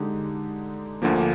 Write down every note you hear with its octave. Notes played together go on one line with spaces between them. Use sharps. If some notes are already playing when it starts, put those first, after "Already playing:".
Already playing: D3 G#3 D#4 G4
D2 D3 F3 A#3